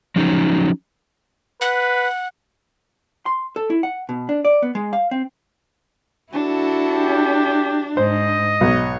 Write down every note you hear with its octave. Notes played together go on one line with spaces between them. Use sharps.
F3 F#3 C#4 D#4
B4 F#5
C6
A4
E4
F#5
B2
D4
D5
B3
G#3
F5
C4
D4 E4 F#4 A4
G4
G#2 C5 D#5
B1 C#5